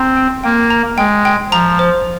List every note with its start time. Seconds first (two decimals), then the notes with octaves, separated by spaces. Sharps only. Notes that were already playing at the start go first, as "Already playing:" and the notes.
Already playing: C4 A#5
0.17 G5
0.44 A#3 G5
0.70 A#5
0.98 G#3 G5
1.25 G5
1.52 F3 A#5
1.79 C5